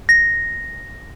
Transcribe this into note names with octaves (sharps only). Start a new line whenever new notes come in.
A#6